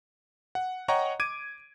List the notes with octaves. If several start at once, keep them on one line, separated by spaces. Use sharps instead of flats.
F#5
C#5 D#5 F#5 G5 A#5 C#6
D6 G#6 D7 D#7